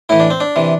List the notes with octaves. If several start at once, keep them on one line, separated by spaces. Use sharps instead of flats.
A2 E3 E4
D4
C4
D4
C3 E3